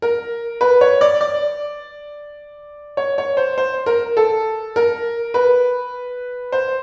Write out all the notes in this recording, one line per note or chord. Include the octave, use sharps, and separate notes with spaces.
A#4
B4
C#5
D5
D5
C#5
C#5
C5
C5
A#4
A4
A#4
B4
C5